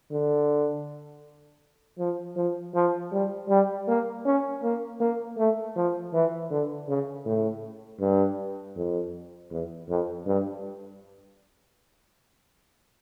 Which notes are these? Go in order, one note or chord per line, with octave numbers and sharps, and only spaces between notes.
D3
F3
F3
F3
G3
G3
A#3
C#4
A#3
A#3
A3
F3
E3
D3
C#3
A2
G2
F2
E2
F2
G2